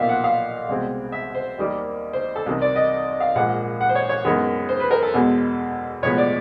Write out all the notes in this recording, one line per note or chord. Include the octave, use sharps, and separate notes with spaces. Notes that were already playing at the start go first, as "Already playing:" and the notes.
Already playing: B1 A#2 F3 A#3 D#4 E5 F5
F#5
F5
C2 B2 G#3 C4
E5
C5
D#2 D#3 G3 A#3
C5
A4
C2 C3 D#3
D5
D#5
F5
A#1 G#2 F3 A#3 F#5
F#5
C5
C#5
C#5
F#2 D#3 G#3 B3 E4
C5
B4
A#4
A4
E2 B2 G#3
B1 A2 F3 G#3 B3 C#5
D5